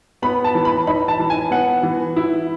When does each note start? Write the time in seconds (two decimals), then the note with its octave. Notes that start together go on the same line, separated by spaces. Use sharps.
0.22 B3 B5
0.44 A5
0.55 E3
0.65 B5
0.87 D#4 B5
1.08 A5
1.19 E3
1.30 G#5
1.51 B3 F#5
1.83 E3
2.16 E4